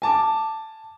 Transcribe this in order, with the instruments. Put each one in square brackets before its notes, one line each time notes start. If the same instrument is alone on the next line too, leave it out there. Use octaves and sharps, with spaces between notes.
[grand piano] G#5 A5 D6